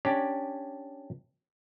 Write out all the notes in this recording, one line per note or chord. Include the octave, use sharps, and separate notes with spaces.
C#4 D4 G4 C#5 D5